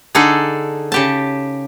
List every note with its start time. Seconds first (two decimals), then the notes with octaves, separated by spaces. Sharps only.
0.15 D3 D4 D#4 G#4 A4
0.92 C#3 G4 A5